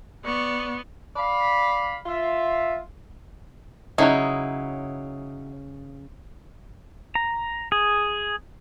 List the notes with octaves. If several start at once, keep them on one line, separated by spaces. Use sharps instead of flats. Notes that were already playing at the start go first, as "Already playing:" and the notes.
B3 D5 C#6
D5 F5 B5
F4 E5
C#3 F#3 D#4 E4
A#5
G#4